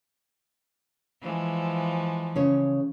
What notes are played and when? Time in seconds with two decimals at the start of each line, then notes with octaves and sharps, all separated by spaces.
1.22 E3 F3 G#3
2.36 C#3 C#5